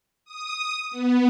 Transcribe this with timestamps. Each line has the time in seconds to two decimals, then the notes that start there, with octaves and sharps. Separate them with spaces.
0.25 D#6
0.91 B3